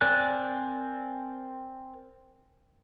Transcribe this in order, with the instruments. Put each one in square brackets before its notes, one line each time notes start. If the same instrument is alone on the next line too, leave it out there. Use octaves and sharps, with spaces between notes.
[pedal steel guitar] C4 A#4 D5 G#5 F#6